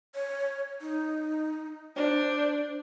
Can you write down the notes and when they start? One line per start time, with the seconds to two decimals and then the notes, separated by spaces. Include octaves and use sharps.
0.15 C#5
0.81 D#4
1.96 D4 C5